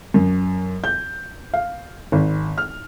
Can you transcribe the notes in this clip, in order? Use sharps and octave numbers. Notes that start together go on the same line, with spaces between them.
F#2
G6
F5
G#1
F6